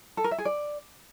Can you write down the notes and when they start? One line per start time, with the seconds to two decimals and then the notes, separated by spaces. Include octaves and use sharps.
0.17 A4
0.24 A#4
0.31 E5
0.38 G#4
0.45 D5